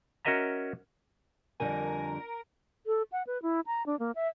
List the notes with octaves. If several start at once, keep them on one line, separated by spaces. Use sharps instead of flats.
C#4 F#4 A#4 D#5 E5 A#5
F2 D3 G3 A#4 G#5
A4
F#5
B4
E4
A#5
D4
A#3
E5